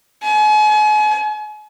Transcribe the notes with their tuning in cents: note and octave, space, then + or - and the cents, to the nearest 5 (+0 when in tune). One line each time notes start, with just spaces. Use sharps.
G#5 +40